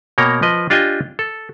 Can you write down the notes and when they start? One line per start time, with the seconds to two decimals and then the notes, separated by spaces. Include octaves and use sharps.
0.18 B2 A#3 C#5 G5 A#5
0.42 F3 B4 D#5
0.70 D4 F4 G4 D#5 G5 G#5
1.19 A4